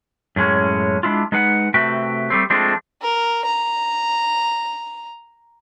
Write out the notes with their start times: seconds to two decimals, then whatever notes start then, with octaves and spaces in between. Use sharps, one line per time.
0.36 F#2 A2 G#3 C#4
1.03 G#3 D4 E4 F4
1.32 G#3 D#4 B4 F#5
1.74 C3 A3 F#4 B4 E5 G5
2.30 G3 A3 C4
2.50 F3 G#3 A3 C4 D4
3.02 A#4
3.45 A#5